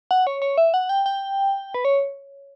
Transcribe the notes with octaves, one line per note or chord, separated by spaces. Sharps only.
F#5
C#5
C#5
E5
F#5
G5
G5
B4
C#5